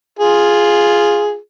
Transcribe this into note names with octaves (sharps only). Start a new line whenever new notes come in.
F4 G#4